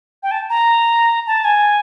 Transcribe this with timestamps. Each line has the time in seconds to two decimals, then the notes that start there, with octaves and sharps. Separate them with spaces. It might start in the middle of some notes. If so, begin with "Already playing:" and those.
0.23 G5
0.31 A5
0.50 A#5
1.27 A5
1.45 G#5